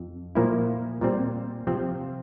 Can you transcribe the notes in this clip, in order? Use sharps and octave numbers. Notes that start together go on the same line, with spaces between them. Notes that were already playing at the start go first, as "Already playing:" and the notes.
Already playing: F2
A#2 F3 A#3 E4
A#2 G3 C4
C3 F3 C4